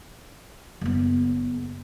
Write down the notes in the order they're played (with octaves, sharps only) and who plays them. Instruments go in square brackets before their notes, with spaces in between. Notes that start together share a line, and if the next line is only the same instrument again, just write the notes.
[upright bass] F#1 B3